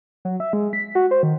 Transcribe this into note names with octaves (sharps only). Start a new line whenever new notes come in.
F#3
E5
G#3
B6
F#4
C5
D#3